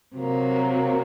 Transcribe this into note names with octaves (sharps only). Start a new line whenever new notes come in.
C3 F#3 A#3